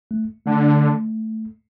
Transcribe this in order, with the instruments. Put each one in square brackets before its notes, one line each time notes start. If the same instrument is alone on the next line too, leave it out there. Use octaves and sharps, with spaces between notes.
[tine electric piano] A3
[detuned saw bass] D3 [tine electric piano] A3